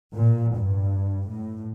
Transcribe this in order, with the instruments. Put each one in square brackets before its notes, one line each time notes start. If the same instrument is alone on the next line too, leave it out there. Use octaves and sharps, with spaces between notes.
[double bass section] A#2
G2
A2